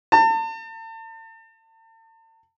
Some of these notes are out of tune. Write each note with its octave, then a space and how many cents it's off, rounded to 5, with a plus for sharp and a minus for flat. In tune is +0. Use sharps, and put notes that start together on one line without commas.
A5 +40